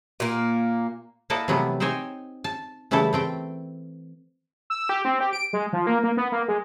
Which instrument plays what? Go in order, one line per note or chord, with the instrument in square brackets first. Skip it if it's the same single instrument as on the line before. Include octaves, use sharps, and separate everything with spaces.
[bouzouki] A#2 A#3
[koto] A#3 E4 A4 D5 D#5 F#5
C3 E3 F#3 G3 A3 B3
C4 D#4 C5 C#5 G5 G#5
A5
C#3 E3 G3 A3 E4 A4
A3 C4 G5
[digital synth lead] E6
G4
C4
G4
D7
G#3
F3
A#3
A#3
B3
A#3
G#3